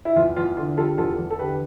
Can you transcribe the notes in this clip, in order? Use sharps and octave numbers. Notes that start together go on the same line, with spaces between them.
E4
E2 F4
E2 F4
D3 F4
G3 F4 A4
E2 F4 A4
E2
A4
D3 G4 B4